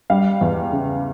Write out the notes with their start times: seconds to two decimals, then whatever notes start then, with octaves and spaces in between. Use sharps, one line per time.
0.10 G3 F5
0.41 E2
0.72 C#3